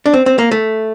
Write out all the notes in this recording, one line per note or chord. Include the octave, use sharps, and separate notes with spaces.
D4
C4
C4
A#3
A3